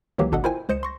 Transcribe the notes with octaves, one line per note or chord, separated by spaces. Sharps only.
C#2 D#3 E3 F#3 A#3 G4
G#1 B2 D4 A4 D#5 F#5
E4 F4 A#4 C5 G5 G#5
C#2 C5 D#5 C#7 E7
C6 C#6 A#6